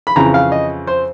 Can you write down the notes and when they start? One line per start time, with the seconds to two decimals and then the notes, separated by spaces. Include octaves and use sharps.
0.07 B5
0.16 F2 C#3 E3 A#5
0.34 F5
0.52 D#5
0.87 C5